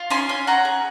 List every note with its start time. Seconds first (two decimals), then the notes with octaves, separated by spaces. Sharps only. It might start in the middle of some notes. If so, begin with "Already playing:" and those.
Already playing: F4
0.10 C#4 G#5 C6
0.29 C#4
0.47 C#4 F#5 A#5
0.65 G#4